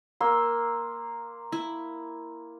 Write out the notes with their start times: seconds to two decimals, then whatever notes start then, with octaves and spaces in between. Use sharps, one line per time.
0.20 A#3 C6 E6
1.52 E4